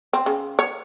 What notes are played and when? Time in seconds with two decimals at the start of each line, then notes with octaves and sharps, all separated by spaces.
0.13 C4
0.26 C#3
0.59 C#5